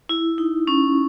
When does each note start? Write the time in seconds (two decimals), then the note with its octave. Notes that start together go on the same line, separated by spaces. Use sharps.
0.09 E4
0.38 D#4
0.67 C#4